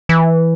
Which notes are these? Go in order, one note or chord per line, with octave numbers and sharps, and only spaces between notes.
E3